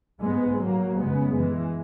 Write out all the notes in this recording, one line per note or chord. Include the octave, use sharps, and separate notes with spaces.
G#2 G#3 B3
F#3 A#3
F#2 C#3 G#3 B3
E3 G#3